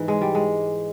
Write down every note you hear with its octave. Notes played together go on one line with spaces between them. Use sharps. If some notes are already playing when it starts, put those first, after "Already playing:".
Already playing: G#2 E3
G#3
G3
G#3